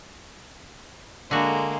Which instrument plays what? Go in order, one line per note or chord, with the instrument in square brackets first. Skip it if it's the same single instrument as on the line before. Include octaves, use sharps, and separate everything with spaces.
[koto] D3 F#4 [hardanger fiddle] G#3 A#3